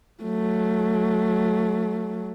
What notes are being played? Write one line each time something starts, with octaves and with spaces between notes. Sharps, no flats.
F#3 A3